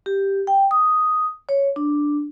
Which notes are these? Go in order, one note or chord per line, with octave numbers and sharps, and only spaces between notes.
G4
G5
D#6
C#5
D4